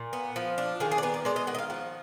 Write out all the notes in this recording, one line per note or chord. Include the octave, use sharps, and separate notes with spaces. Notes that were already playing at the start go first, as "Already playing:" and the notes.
Already playing: A#2
B3
F3
D4
D#3 G#4
G#4
D5
B3 B4
D5
G#3 D5
D#5
D#3 F#5
D#5
F5
F3 F#5